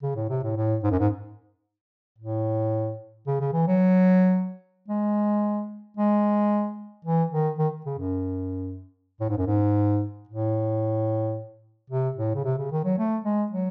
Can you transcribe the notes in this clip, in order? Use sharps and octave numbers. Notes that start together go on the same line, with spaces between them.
C#3
A2
C3
A2
A2
G#2
F#2
G#2
A2
C#3
C#3
E3
F#3
G#3
G#3
E3
D#3
D#3
C#3
F#2
A2
G#2
F#2
G#2
A2
C3
A2
C#3
C3
C#3
D#3
F#3
A3
G#3
F#3